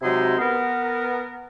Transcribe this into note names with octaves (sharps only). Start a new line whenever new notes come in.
C3 F#3 G#3 D#4 E4 C6
B3 A#4